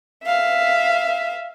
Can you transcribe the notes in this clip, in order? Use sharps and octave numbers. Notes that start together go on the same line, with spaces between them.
E5 F5